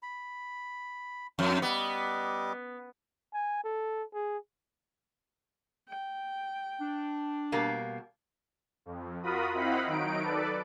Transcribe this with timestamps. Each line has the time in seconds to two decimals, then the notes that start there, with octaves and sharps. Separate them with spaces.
0.03 B5
1.39 F2 G5
1.62 G3 B3 D#5 D6
3.34 G#5
3.64 A4
4.14 G#4
5.89 G5
6.81 D4
7.52 B2 G3 A#3
8.86 F2
9.23 F4 F#4 A#4 B5 D#6
9.54 C4 E4 D#5 F5 F#5 B5
9.87 D#3 F#3 D#4 D7
10.23 A4 B4 D5